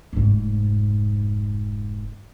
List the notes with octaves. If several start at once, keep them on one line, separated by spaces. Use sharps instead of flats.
F1 G#2